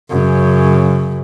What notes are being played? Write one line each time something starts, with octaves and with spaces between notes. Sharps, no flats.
F#2 C#3